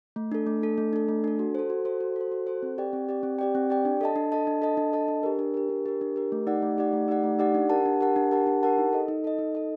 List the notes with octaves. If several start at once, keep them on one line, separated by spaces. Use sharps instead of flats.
A3
D4 A4
A3
D4 A4
A3
D4 A4
A3
D4 A4
F#4
A4 C5
F#4
A4 C5
F#4
A4 C5
F#4
A4 C5
C4
G4 D5 G5
C4
G4 D5 G5
C4
G4 D5 G5
C4
G4 D5 G5
D4
A4 D#5 A5
D4
A4 D#5 A5
D4
A4 D#5 A5
D4
A4 D#5 A5
D4
G4 A#4
D4
G4 A#4
D4
G4 A#4
D4
G4 A#4
A3
D#4 G4 D5 F#5
A3
D#4 G4 D5 F#5
A3
D#4 G4 D5 F#5
A3
D#4 G4 D5 F#5
D4
G4 A#4 F#5 A5
D4
G4 A#4 F#5 A5
D4
G4 A#4 F#5 A5
D4
G4 A#4 F#5 A5
D#4
A4 D#5
D#4
A4 D#5
D#4
A4 D#5